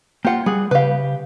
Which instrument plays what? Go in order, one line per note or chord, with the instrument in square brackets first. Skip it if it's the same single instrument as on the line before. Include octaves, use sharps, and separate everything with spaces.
[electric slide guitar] A#3 F4 [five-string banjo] G4 F#5
[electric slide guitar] G3 F#5 [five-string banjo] G#4
[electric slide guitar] C#3 G4 [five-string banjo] B4 F5